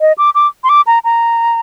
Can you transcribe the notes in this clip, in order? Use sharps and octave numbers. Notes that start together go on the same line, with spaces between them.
D#5
D6
D6
C6
D6
A#5
A#5